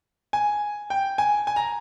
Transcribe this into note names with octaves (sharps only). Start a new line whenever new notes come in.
G#5
G5
G#5
G#5
A#5